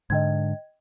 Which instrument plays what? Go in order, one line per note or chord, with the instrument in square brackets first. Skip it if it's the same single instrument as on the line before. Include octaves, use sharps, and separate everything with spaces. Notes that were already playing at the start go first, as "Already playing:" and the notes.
[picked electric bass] G#2 D3 [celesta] D#5 G5 G#6